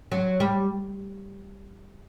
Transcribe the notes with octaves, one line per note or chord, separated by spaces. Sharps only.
F#3
G3